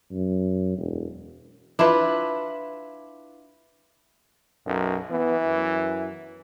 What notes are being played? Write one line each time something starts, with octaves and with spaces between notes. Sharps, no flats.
F#2
E1
D4 E4 F4 B4
B1 F#2
E3 B3
F#2